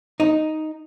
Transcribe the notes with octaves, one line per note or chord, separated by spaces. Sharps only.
D#4